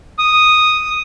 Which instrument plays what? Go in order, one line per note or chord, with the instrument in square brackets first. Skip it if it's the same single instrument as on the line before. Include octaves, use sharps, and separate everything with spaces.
[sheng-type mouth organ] D#6